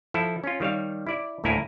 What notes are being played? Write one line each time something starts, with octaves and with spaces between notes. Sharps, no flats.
F3 E4 A4
C#4 F4
D#3 G3 C#5 F5
E4 D5
D2 A2 A#3 E4 A#4 G#5